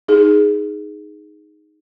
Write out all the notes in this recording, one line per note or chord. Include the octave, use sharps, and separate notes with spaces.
D#4 G#4